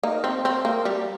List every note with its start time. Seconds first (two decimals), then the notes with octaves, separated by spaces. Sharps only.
0.03 A#3 D#4
0.24 C4
0.45 C4
0.65 A#3
0.85 G3